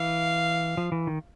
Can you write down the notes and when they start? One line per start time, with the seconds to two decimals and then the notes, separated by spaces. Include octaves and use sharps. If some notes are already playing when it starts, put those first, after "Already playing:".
Already playing: E3 F5
0.77 F3
0.92 E3
1.07 D#3